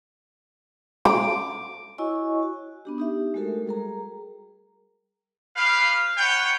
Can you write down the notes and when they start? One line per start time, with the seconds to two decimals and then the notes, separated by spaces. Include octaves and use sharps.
1.05 D6
1.98 E4 F#4 C#5 D#5 G#5 C#6
2.43 F#4
2.85 B3 D4 G4
2.98 D#4 G4 E5
3.34 G#3 A3 F#4 A4 A#4
3.66 G3 G#4 A#4 A#5
5.56 G4 B4 F5
6.17 F4 B4 C#5 F#5 G5